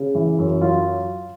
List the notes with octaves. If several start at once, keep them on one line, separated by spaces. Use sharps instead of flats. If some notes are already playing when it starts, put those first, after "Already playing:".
Already playing: C#3
E3
F#2
F#3 F4